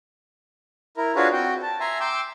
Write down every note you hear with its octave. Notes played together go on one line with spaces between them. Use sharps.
E4 A#4
D4 F4 F#4 G#4 B4 C#5
C4 F#4 G5
A5
E5 G#5 A#5 C6
G5 C6 D6 E6